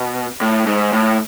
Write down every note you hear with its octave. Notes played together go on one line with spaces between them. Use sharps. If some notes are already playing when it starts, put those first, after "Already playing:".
Already playing: B2
A2
G#2
A2